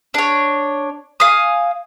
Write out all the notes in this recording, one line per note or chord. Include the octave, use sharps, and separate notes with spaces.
D4 C#5
F5 G#5 D#6